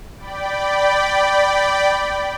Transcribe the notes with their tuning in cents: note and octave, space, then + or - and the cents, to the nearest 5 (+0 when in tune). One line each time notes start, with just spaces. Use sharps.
D5 +0 G5 -10 B5 +0